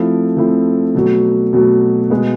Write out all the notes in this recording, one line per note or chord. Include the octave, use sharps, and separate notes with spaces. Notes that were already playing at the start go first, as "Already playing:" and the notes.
Already playing: F3 A3 C4 E4
F3 A3 C4 E4
B2 F#3 A3
B2 F#3 A3
B2 G#3 B3